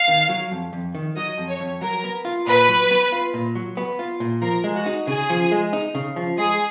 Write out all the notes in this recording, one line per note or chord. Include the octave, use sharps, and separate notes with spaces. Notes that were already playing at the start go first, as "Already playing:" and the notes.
Already playing: F5
D#3
F#3
F2
F2
D#3
F#3 D#5
F2
C#5
F2
F#3 A#4
B3
F4
A#2 B4
F#3
B3
F4
A#2
F#3
B3
F4
A#2
F3 A#4
G#3
F#4
D#4
C#3 G#4
F3
G#3
D#4
C#3
F3
G#3 G#4